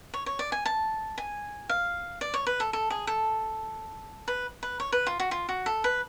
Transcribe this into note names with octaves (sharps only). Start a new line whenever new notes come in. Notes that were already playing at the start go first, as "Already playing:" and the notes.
C#5
C#5
D5
G#5
A5
G#5
F5
D5
C#5
B4
A4
A4
G#4
A4
B4
B4
C#5
B4
F4
F#4
F4
F#4
A4
B4